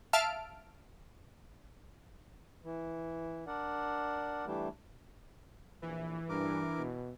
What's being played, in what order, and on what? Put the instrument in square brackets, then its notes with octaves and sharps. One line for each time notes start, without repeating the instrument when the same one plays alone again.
[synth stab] E5 F5 A5 F6 D7
[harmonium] E3
D4 A#4 D5 F#5
E3 G3 A3 D4
[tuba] A#1 [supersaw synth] E3
[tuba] G2 [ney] D4 [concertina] A#4 D6
[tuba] B2